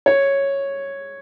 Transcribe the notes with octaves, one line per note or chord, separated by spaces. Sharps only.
C#5